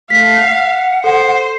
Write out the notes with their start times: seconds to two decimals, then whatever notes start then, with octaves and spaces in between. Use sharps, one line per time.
0.10 A3 F5 B6
0.40 F#5
1.04 A4 C5